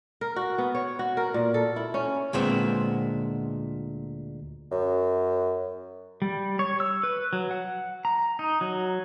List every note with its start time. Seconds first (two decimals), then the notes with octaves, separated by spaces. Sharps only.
0.21 A#4
0.36 F#4
0.58 B3
0.75 C#5
0.99 F#4
1.17 A#4
1.34 A#2
1.54 A4
1.76 E4
1.94 C#4
2.33 D2 A#2 G#3 B3 C4
4.72 F#2
6.22 G3
6.59 C#5
6.80 E6
7.03 B4
7.33 F#3
7.51 F#5
8.05 A#5
8.39 D#4
8.61 F#3